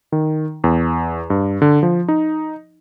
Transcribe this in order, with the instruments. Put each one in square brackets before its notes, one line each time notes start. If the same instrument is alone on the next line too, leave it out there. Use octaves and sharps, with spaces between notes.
[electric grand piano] D#3
E2
G2
D3
F3
D#4